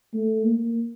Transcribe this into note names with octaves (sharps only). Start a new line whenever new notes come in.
A3
A#3